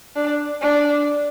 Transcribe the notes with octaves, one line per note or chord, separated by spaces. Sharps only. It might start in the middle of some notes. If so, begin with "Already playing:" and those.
D4
D4